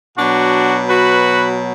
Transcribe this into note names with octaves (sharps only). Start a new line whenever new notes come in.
B2 F#3 D4 F#4
F#4 B4